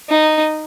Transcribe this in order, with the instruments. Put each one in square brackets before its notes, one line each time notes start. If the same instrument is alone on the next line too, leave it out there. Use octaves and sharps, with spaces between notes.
[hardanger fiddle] D#4